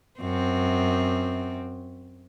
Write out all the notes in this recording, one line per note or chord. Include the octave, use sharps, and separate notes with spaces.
F#2 C4